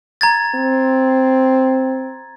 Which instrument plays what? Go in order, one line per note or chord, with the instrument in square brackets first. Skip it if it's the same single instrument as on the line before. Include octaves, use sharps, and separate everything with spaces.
[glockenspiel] A#5 G#6 A6
[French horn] C4